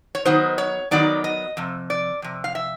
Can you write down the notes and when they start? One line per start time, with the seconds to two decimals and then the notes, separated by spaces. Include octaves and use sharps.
0.15 C#5
0.25 D#3 F#3 B3 D#4 C5
0.58 C#5
0.91 D#3 F#3 B3 D#4 D5
1.24 D#5
1.57 F2 C3
1.90 D5
2.22 F2 C3
2.44 F5
2.55 E5